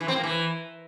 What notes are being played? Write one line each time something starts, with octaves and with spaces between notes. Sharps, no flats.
E3
C4
A#3
E3